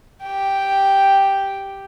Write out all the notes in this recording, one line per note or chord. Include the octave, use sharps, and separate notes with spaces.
G4 G5